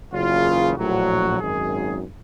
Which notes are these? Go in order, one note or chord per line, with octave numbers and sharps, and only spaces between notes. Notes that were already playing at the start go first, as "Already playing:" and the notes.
F#1 E2 C#3 F4
A#1 A2 F#3 F#4
G#1 F#2 D#3 G#4